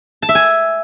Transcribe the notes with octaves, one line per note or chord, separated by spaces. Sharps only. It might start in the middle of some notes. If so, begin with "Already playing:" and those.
A5
E5
G#5